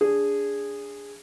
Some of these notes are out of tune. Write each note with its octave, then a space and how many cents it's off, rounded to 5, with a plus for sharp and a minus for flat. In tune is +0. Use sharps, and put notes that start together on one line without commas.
D4 -25 G#4 -15